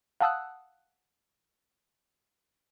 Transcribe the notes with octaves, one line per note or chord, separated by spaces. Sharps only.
F5 F#5 A5 D#6 E6 F#6